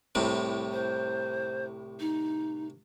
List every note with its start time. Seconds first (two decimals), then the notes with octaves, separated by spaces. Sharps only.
0.15 C2 A2 C3
0.73 C5
2.00 D#4